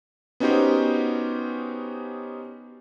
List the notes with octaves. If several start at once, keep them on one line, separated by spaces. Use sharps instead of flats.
B3 C#4 D#4 F#4 G4 C5